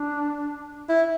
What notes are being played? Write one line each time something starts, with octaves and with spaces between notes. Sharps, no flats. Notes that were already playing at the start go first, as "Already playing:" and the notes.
Already playing: D4
E4